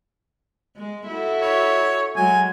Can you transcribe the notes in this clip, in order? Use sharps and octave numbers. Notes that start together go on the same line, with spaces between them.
G#3
E4 F#4 A4
C#5
F#3 G#3 G#5